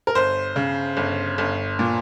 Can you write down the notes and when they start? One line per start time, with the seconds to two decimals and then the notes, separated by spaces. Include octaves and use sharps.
0.07 A#4
0.15 G1 C5
0.56 C#3
0.97 G1
1.38 G1
1.79 A#2